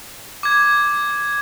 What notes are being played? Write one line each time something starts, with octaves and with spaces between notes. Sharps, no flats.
D6 G#6